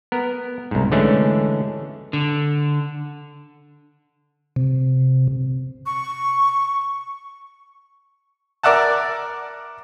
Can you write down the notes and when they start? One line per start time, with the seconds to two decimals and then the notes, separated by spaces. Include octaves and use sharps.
0.12 B3 A#4
0.71 C2 G#2
0.92 D3 E3 G#3 A3 C#4 D4
2.13 D3
4.56 C3
5.86 C#6
8.63 A#4 D5 E5 F#5 A5